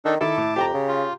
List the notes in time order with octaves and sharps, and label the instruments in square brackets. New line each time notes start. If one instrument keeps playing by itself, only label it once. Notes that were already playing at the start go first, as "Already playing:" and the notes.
[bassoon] D#3 [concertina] D4 D#4 A4
[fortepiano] D#3 A4 [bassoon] E4 [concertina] A5 D6
[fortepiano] A2
[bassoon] F2 [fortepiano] G4 G5 A#5
[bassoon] C#3
[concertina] F4